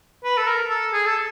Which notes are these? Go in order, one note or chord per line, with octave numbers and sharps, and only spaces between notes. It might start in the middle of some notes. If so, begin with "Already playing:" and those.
B4
A4
A#4
A4
G#4
A4